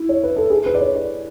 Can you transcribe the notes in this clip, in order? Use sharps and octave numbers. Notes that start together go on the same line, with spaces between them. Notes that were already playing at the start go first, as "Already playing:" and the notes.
Already playing: E4
C#5
B4
A4
G#4
B4
D5
C#5
D5